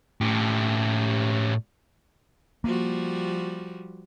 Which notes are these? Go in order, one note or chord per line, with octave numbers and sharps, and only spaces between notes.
A2 G4
F3 G3 A#3 F#4